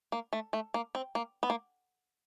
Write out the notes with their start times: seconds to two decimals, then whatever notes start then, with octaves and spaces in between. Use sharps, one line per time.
0.12 A#3
0.33 A3
0.53 A3
0.74 A#3
0.95 C4
1.15 A#3
1.43 B3
1.50 A#3